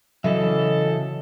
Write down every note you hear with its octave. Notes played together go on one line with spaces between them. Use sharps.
C#3 E3 F#3 A4 D#5 E5